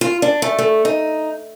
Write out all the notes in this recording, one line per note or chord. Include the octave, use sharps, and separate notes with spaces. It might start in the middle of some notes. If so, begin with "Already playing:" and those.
F4
D4
A3
A3
D#4